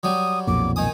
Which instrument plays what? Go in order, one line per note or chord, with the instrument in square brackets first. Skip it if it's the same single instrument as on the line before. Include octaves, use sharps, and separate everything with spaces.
[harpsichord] F#3 G3 [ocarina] D#6
[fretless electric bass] B1 F2 A#2 [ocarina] D6
[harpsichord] D#3 D#6 [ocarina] G#5